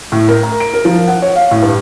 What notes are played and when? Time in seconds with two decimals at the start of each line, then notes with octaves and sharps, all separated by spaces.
0.12 A2
0.29 A#4
0.43 A#5
0.60 D7
0.74 A#4
0.85 F3
1.08 F#5
1.22 C#5
1.36 F5
1.51 A2
1.62 G2